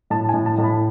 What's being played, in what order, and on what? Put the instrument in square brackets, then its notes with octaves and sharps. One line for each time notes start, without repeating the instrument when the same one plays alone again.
[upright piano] A2 A5
G#5
A2
A5
A2 A5
B5